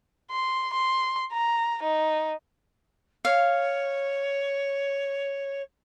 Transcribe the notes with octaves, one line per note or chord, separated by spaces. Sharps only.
C6
C6
A#5
D#4
C#5 F5